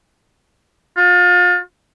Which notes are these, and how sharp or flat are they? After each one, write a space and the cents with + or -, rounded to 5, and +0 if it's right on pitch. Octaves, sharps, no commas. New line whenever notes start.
F4 +35